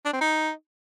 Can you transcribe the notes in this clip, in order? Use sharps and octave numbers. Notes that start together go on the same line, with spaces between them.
D4
C4
D#4